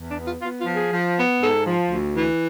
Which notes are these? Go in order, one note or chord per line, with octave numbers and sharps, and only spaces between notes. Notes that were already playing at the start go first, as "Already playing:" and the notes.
Already playing: E2
D4
B3
F4
B3 F4
F4
F3
G#4
F3
B3
G#2 A4
F3
D2
E3